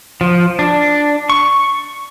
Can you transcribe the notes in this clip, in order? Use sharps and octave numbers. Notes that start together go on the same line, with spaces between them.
F3
D4
C#6